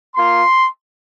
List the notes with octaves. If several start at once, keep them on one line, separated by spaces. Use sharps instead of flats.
A#3 F4 C6